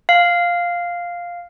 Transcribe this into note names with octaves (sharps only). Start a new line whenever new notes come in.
F5